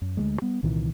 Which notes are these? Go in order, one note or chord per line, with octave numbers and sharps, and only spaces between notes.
F#2
D2 F#3 G#3
G3 B3
C2 A#2 D#3 E3